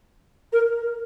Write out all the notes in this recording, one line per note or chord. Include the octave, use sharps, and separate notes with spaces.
A#4